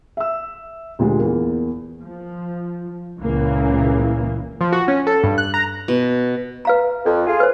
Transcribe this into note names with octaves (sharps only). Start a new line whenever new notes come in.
E5 E6
D2 A#2 G3 G#3
E2 A#3
F3
C#2 A#2 C#3 E3 A#3
F3
F#4
C#4
A4
G2
F#6
A#5
B2
B4 F5 A#5
F2
F4 G#4
B4 C5